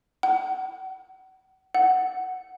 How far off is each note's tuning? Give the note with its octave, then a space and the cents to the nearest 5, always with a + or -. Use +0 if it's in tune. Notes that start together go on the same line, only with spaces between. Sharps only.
F#5 +35
F#5 +5